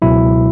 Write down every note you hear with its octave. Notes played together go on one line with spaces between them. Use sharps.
C#2 B2 F#3 E4